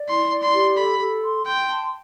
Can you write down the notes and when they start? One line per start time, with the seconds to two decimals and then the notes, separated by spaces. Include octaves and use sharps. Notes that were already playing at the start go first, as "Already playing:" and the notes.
Already playing: D5
0.09 E4 C6
0.31 D5
0.43 C6
0.54 G4
0.77 A4 B5
1.00 A4
1.23 C6
1.45 G5 C6
1.68 A5